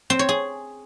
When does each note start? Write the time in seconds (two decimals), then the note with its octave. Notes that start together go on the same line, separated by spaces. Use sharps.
0.10 C4
0.19 C#5
0.29 G#4